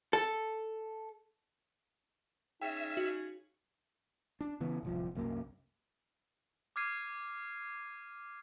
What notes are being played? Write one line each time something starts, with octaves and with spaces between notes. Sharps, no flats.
A4
C#3 C#4 D#4 G#4 E5 G5
F#4
D4
C#3 E3 B3
D1 C2 F3
C2 F#2 A#3
D6 F6 G#6 C7 D#7